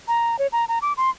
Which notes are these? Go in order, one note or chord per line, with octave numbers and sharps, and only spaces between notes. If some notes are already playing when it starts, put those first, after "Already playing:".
A#5
C#5
A#5
A#5
D6
C6